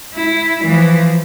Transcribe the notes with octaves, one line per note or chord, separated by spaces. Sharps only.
E4
E3 F3